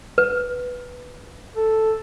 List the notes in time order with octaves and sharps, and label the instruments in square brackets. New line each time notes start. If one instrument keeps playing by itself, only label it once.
[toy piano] B4
[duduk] A4